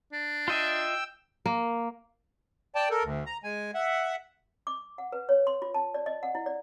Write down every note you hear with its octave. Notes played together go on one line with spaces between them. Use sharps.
D4
F4 D#5 E5 G5 E6
A#3
D5 G5 A5
A4 A#4
D2
A#5
G#3 G#5
E5 F#5
D6
F#5
B4
C#5
C6
F4
A5
D5
D#5
F#5
E4
D5